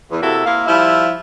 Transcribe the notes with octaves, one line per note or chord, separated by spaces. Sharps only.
E2
C3 A#3 E4 F#4 A4
A#3 C4 E4 F5
F3 G3 E4